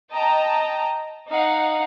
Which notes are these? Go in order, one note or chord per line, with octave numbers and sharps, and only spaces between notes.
D#5 G5 A5 A#5
D#4 F5 F#5